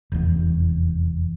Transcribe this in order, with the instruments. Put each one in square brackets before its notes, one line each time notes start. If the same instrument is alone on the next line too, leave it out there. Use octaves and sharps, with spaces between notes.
[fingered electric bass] F1 E2